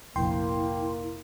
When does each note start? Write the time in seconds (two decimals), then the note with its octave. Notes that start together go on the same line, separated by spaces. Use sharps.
0.16 F1 A#1 A#3 E4 G5 C6